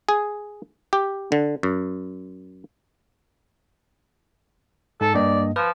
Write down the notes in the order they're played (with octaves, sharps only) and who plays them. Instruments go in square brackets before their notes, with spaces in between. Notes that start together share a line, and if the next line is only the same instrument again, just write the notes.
[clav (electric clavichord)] G#4
G4
D3
F#2
[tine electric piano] G#2 [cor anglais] A4
[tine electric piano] G2 A#3 D#5 [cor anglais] D5
[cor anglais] F3 [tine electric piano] B4